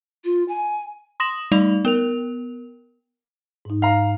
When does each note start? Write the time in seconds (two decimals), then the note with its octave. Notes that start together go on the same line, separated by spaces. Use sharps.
0.25 F4
0.49 G#5
1.20 C6 D#6 A#6 E7 F#7
1.52 G3 A3 D#4 D5 F7
1.85 B3 A#4 F7
3.65 G#2 D#4
3.82 F5 A#5